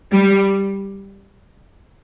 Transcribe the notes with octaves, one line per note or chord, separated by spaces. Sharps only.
G3